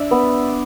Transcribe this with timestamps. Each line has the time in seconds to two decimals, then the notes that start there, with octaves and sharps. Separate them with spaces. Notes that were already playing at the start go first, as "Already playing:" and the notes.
Already playing: D4 D5 E5
0.11 B3